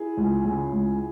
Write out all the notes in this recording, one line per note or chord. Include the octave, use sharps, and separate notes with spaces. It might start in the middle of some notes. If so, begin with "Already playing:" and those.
Already playing: E4 G#4
C#2
C#3
C#2